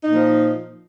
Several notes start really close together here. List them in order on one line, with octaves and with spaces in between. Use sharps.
D#4 A#2 F3